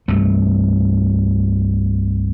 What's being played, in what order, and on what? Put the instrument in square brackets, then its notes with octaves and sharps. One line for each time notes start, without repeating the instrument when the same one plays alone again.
[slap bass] C2 G2 A3